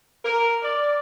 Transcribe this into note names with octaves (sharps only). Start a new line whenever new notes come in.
A#4
D5